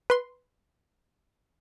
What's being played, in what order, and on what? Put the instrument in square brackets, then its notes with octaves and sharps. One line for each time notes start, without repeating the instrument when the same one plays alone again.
[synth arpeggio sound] B4 C6